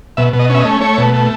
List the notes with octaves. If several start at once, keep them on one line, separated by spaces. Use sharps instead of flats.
B2 E5
B2
D#5
C#4 E5
D#5
A3
A3 C#5
B2
A3